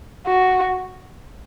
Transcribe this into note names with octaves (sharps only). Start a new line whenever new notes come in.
F#4